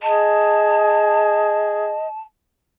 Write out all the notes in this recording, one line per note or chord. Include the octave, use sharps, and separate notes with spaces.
G#4 D#5 A5